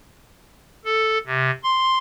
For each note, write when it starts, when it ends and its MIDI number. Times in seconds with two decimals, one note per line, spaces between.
0.85 1.18 69
1.27 1.51 48
1.63 1.98 84